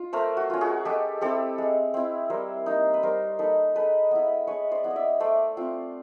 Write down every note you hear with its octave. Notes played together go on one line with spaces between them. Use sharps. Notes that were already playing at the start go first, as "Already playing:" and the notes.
Already playing: F4
A3 A#4 C5
F#4
C#4 F4
F#4 G#4
G#3 G4 A4
C4 E4 G4 A4
G#3
C4 E4
G3 A#4 C5
A#3 D#4
B4
G3 A#4 C5
A#3 D#4 A4 B4
G#3 A4 B4
B3 E4
G#3 B4 C#5
C5 D5
B3 E4
D#5
D5 E5
A3 C5 D5
C4 F4